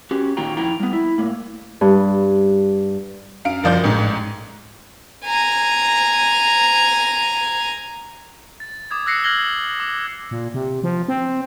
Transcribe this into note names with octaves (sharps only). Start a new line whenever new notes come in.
C#4 F#4 G4
A#2 D#3 A#3 F#4 G5 A#5
F2 E4 G5 A#5
G3 B3
E4
A2 A#3
G2
F#2 F5 D7
F#1 F3 D5 G6
A1 G#2
G#5 A#5
A6
D6 D#6 G#6
E6 F#6 A#6 C7 C#7
F6 F#6 G#6 A#6 F#7 G7
D6
A#2
C3
F3
C4